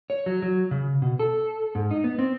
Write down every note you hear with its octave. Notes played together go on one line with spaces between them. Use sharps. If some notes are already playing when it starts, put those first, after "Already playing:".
C#5
F#3
F#3
C#3
B2
A4
G#2
D#4
B3
C4